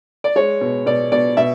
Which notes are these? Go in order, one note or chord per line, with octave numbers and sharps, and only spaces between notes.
D5
G#3 C#5
B2
B2 D5
B2 D5
B2 E5